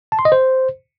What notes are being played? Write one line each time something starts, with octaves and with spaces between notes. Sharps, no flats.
A5
C6
D#5
C5